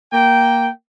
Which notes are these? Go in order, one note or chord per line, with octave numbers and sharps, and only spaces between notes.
A#3 G5